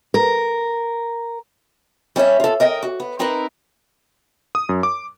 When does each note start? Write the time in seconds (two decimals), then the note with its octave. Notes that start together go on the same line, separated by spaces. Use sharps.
0.14 A#4
2.16 G3 C#4 C#5 E5
2.40 F4 A4
2.60 A#4 D#5 G5
2.83 F#4
3.00 B3
3.19 C4 D#4 E4 A#4 B4
4.55 D#6
4.69 F#2
4.83 D6